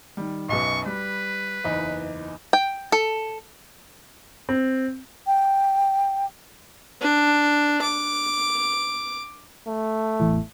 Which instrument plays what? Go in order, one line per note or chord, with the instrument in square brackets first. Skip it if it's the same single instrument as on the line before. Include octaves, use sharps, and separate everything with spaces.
[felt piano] D#3 G3
[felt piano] B1 F#2 B2 [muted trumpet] C#6
[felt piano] G3 [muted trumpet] B4
[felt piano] F#1 E2 D#4
[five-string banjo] G5
A4
[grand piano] C4
[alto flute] G5
[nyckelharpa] D4
D6
[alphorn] A3
[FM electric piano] A1 E2 A2